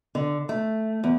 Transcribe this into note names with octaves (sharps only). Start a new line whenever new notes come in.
D3
A3
E2